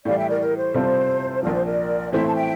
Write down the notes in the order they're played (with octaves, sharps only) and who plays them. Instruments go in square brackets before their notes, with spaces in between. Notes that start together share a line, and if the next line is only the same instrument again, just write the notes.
[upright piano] A2 E3 G3 [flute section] D5 F5
[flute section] E5 G5
A#4 D5
A#4
C5
[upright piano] C3 G3 C4 F4 A4
[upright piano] A#1 A#2 F3 [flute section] A#4 D5
[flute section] C5
A#4 D5
[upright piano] A2 E3 A3 C4 E4 [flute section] C5 E5
[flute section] A5
E5 G5